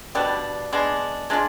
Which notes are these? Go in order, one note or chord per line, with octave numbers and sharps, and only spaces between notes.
B2 G3 B3 D4
G#3 B3 D4
G#3 D4 F4